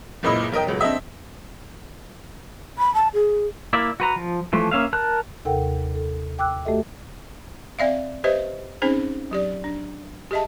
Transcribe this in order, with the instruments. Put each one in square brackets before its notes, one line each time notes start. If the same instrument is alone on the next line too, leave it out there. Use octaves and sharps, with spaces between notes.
[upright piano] F#1 C#2 A#2 E4 D#5 B5
B1 A#4 D#5 G5
D#1 C#2 F#3
C4 D4 D#5 E5
[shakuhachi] B5
A5
G#4
[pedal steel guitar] A#3 E4 D5 E5
F#4 B4 A#5
F3
E3 F3 A3
A#3 C#4 E5 F5
A#4 A5 F#6
[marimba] D#2 C3 A4 A#4 F#5 G5
A4
G5 D6 E6 F#6
A3 F#4 G4 A4 D#5 E5
[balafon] C4 D5 E5 F5
G4 B4 C5 D#5 E5
C4 C#4 D#4 G#4 C5
F#3 G4 D5
D4
G4 G#4 D#5 E5 A5